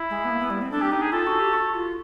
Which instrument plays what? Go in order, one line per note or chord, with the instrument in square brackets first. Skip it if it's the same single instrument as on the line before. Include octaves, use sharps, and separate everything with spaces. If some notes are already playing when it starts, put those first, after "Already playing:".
Already playing: [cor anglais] E4
[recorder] G#3
B3
A#3
B3
G3
C4
[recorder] D4 [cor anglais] A4
[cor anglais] G4
[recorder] D#4 [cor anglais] G4
[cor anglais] G#4
[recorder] F4 [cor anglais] A4
[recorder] F#4
G4
F#4
F4